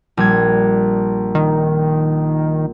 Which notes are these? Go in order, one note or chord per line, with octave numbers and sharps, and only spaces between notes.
A#1 G3 G#6
D#3